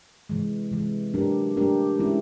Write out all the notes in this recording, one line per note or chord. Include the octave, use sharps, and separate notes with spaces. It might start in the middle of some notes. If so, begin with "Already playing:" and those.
C3 E3 G#3
C3 E3 G#3
F#3 A3 D4 G4 A#4
F#3 A3 D4 G4 A#4
E3 G#3 C#4 E4 G4